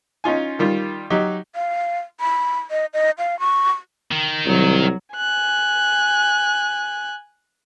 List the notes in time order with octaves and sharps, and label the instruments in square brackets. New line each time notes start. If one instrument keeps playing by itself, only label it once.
[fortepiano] C#4 D#4 F4 G#5
D#3 G3 F4
F#3 D#4 G4
[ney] F5
B5
D#5
D#5
F5
C#6
[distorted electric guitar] D#3
[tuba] C2 [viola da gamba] F#3
[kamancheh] G#5 F#6